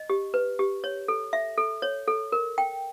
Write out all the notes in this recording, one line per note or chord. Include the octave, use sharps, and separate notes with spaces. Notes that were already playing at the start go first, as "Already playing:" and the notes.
Already playing: D#5
G4
B4
G4
C#5
A4
E5
A4
C#5
A4
A#4
G5